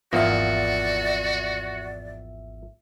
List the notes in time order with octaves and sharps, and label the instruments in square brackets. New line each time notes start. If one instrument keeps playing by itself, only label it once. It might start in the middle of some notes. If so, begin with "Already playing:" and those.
[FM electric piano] G#1 E5 [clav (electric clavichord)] E2 F3 A#3 [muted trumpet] F#4 [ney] D5